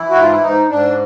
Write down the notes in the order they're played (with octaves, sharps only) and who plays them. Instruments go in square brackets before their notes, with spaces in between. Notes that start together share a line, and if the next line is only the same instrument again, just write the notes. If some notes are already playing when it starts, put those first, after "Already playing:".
Already playing: [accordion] E3 E4
F#4
G#2
F4
E4
G#2 D#4
G#2 D4